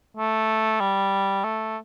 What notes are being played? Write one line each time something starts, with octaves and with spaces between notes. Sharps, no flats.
A3
G3
A3